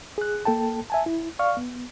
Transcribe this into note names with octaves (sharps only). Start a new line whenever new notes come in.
G#4 F#6
A#3 A4 G5 A5
E5 G#5 A5
E4
D5 F5 C#6 F6
B3